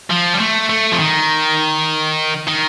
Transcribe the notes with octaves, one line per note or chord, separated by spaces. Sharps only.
F3
G3
A3
A3
F3
D#3
D#3